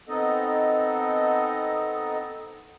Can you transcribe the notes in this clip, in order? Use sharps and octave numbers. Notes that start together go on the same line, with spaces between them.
B3 C4 D#4 A4 D#5